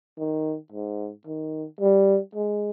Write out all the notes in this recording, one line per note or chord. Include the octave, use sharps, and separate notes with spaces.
D#3
G#2
D#3
G3
G#3